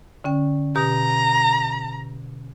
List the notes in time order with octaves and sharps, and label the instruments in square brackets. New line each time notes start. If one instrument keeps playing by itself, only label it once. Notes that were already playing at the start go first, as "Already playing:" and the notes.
[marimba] D3 C#4 G5
[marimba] B2 G4 D#6 [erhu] A#5